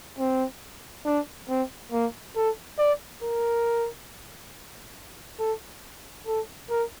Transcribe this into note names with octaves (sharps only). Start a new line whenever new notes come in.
C4
D4
C4
A#3
A4
D5
A#4
A4
A4
A#4